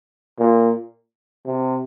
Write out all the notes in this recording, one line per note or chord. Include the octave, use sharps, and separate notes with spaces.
A#2
C3